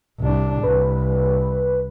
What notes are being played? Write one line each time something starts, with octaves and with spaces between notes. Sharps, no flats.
C2 D4
C2 B4